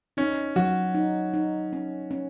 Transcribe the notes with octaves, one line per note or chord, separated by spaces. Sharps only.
C#4 D#4
F#3 F#4
D#4
D#4
C#4
C#4